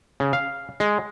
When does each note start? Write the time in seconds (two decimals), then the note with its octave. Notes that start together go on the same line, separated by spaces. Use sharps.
0.20 C#3
0.33 F5
0.80 G#3